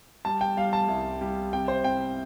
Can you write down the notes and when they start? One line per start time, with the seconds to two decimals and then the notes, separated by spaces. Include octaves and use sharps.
0.25 G3 A5
0.41 G5
0.57 G3 F5
0.73 A5
0.88 C2
1.21 G3
1.53 C3 G5
1.68 C5
1.84 C3 G5